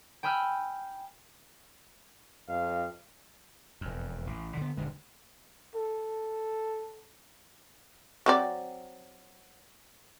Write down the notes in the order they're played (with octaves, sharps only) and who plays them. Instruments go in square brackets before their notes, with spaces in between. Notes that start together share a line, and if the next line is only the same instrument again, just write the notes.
[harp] G5 G#5 B5 E6 F6
[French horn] F2 [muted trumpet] F5
[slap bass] E1 F2
A1
D3 B3
D#1 G2 D3 G#3
[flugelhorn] A4
[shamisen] F#3 C4 D5